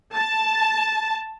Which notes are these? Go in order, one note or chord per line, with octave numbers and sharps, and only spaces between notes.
A5